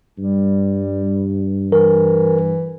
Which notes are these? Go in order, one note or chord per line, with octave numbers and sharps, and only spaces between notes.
G2 G3
E3 A#4